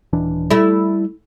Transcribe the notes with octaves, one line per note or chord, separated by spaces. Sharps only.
D#1 E3 D4
G3 A3 E4